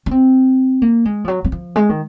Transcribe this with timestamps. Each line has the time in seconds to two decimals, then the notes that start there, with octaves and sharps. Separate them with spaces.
0.06 C#4
0.11 C4
0.82 A#3
1.05 G#3
1.24 F3
1.28 F#3
1.44 F#3
1.52 F3
1.76 G#3
1.89 D#3